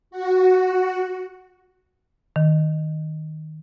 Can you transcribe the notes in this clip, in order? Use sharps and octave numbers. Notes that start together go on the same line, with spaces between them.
F#4
D#3